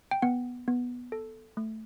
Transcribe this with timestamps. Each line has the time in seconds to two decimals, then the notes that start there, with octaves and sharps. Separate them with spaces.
0.11 G5
0.22 B3 F#5
0.68 B3
1.12 A4
1.57 A3